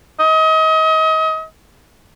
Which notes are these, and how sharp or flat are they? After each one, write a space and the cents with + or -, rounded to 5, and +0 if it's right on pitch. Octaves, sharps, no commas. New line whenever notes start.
D#5 +35